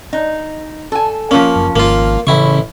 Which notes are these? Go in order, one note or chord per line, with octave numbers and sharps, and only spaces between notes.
D#4
A4 G#5
F3 A#3 C#4
F#1
G#1 A#3 F4
A1 C#3 E4 C#6